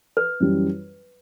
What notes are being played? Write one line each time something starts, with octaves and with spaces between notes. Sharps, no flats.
B4
F#2 E3 G3